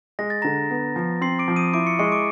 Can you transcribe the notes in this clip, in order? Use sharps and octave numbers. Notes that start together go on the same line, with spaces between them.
G#3 A#6
A6
D3 A#5 A#6
B3
F3
C4 C6 C7
D6 D7
F3
D#6 D#7
E4 D6 D7
C#6 C#7
G#3 C#6 C#7
D6 D7